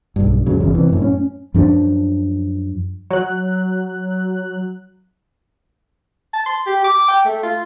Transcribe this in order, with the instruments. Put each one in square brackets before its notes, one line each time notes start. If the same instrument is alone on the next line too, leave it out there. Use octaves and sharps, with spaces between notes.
[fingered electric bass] B1 G2
F2 G#2 C#3 F#3
G1 E2 C#3
C3 E3
F#2 A2
C#4
[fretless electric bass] F#2 F3 D4
[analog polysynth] F#3 F#6
[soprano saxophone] A5
C6
G4
D6
G5
A3
F4